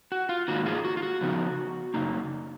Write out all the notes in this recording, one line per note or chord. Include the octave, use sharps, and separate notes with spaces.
F#4
F4
G#2 D#3 A#3 D#4 F#4
F4 G#4
F#4
F4
F#4
C#3 F3 B3 D#4
F#2 C#3 F#3 A#3 D#4